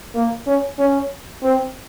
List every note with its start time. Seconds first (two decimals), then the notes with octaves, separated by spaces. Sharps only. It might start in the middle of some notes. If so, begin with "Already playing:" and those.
0.15 A#3
0.47 C#4
0.79 C#4
1.44 C4